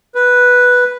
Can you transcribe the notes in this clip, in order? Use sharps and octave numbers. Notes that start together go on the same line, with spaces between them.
B4